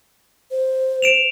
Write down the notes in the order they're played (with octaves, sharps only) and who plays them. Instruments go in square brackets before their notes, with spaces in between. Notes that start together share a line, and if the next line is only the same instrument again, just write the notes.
[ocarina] C5
[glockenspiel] D7 E7 F7